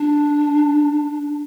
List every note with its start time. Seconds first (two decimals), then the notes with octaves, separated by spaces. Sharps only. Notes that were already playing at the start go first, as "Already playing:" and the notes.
Already playing: D4